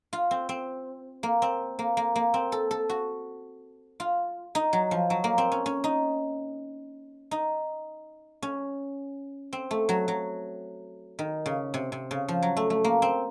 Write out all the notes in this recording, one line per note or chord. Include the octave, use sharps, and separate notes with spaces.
F4
C4
C4
A#3
C4
A#3
A#3
A#3
C4
A4
A4
F#4
F4
D#4
F#3
F3
F#3
A#3
C4
C#4
C#4
D#4
D#4
C#4
C4
A3
F#3
F#3
D#3
C#3
C3
C3
C#3
F3
F#3
A3
A3
A#3
C4